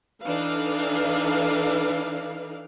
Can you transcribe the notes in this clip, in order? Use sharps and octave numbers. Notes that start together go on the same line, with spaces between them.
E3 D4 D#4 A4 B4 F5